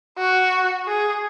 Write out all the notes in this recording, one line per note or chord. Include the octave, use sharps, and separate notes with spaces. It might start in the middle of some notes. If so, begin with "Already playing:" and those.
F#4
G#4